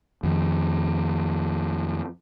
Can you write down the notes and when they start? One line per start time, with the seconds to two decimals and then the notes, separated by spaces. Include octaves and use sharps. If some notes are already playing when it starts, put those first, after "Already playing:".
0.23 F2 D#3